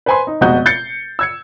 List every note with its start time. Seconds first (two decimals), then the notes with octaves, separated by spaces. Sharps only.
0.06 B4 C5 G#5 B5 C6
0.27 D#4
0.41 F1 B2 G#3 F#4 D#5 G6
0.66 G6 A6 C7 C#7
1.19 E6 G#6 C#7